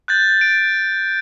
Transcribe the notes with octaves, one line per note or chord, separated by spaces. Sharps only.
F#6 G6 A6
D7